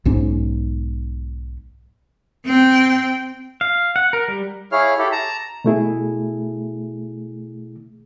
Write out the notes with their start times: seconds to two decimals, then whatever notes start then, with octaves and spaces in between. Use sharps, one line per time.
0.05 B1 G#2 C#4
2.46 C4 G5
3.61 F5
3.96 F#5
4.13 A#4
4.28 G3
4.72 E4 G#4 C#5 F5 F6
4.98 E4 G4 A4
5.12 A5 A#5
5.65 B2 A3 E4 G#4